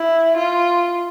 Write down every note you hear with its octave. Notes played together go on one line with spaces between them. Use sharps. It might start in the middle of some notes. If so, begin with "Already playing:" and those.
Already playing: E4
F4